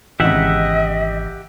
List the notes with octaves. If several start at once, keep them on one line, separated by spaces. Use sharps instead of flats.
G#1 E2 C#3 G4 D#5 E5 F#5